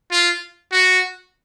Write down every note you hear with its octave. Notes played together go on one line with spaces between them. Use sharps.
F4
F#4